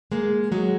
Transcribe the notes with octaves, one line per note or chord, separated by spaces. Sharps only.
G#3 A#3
F#3 G#3